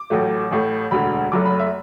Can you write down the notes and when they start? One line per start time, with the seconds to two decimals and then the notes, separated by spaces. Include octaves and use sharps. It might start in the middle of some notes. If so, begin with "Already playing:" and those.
Already playing: D6
0.10 A1 A2 F#3 A3
0.51 A1 A2 A3
0.91 E1 D2 D3 B5
1.32 F#1 F#2 F#3 A3 D6
1.45 B5
1.59 E5